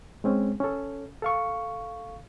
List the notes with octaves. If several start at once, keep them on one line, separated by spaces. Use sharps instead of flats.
G#3 C4 C#4
C#4 A4
A4 F5 C#6